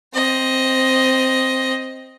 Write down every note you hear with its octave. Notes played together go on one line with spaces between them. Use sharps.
C4 D#5